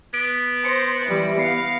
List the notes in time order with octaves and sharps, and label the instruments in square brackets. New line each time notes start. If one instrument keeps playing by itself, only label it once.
[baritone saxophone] B3 [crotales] D7
[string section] C5 [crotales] A#6 C#7
[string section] E3 G3 E4
[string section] B3 F5 [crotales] C7 C#7